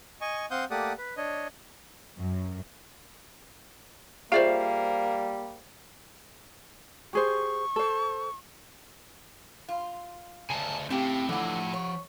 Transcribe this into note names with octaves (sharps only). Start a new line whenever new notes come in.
D#5 G#5 C#6
C4 F5 F#5 C6 D#6 G6
A3 A#3 G4 D5 F#5 D#6
B4
D4 C#5 D#5
F#2
G3 A#3 F4 G#4 C5 D5 E5 F5
G4 G#4 C5 C#6
A4 C5
F4
D2 C#3 G#5 A5
A2 C#3 C4 G4
D3 E3 F3 F#5
C#5